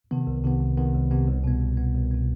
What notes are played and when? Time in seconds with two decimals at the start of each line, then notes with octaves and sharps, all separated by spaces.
0.11 C3 D#3 B3
0.27 C2
0.44 C3 D#3 B3
0.60 C2
0.78 C3 D#3 B3
0.93 C2
1.11 C3 D#3 B3
1.28 C2
1.44 B2 B3
1.61 C2
1.77 B2 B3
1.94 C2
2.11 B2 B3